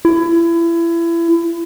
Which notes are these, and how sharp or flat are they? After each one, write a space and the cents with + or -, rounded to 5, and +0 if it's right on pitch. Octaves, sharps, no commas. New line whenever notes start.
E4 +30